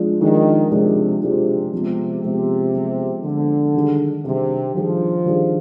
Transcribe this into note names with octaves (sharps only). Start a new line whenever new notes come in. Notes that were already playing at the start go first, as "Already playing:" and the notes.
Already playing: F3 G#3 D4 F4 G#4
D#3 F3 G#3 D4 F4 G#4
C3 F3 G#3 D4 F4 G#4
C3 F3 G#3 D4 F4 G#4
C3 F3 G#3 B3
C3 F3 G#3 B3
F3 G#3 B3
D3 F3 G#3 B3
D#3 G3 D4 G#4
C3 D#3 G3 D4 G#4
D#3 F3 G3 D4 G#4
D#3 G3 D4 G#4